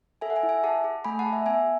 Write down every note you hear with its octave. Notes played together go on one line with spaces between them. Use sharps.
A4 E5 G#5
F#5
E5 G#5
E4
E5 G#5
G#4 F#5 A5
G#4
A3 G#5 B5
F#5 A5
G#4
E5 G#5
B3 E5 G#5